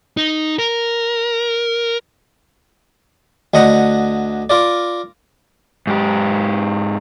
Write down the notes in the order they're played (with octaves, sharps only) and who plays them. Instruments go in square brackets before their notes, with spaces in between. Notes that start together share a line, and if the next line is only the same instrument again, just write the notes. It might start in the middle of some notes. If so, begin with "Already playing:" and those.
[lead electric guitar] D#4
A#4
[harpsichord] D2 D3 D#5 F#5 A#5
F4 A#4 D5
[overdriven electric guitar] G#2 G4